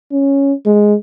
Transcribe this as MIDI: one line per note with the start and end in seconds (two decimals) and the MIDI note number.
0.12 0.53 61
0.66 0.94 56